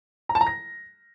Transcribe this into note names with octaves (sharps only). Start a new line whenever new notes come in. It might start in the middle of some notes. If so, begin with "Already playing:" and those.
A#5
A5
A#5
A#6